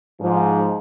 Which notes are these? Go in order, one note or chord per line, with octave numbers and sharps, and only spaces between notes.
G#2 F3